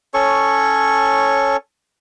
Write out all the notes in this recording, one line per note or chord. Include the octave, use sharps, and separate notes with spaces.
C#4 A4 C#5 C#6